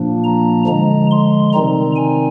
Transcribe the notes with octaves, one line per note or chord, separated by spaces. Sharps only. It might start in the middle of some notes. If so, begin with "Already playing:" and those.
Already playing: A#2 F3 A#3 D4
A#5
D3 F3 G#3 A#5
C6
C3 D#3 G3 C4 D#4 A#5
G#5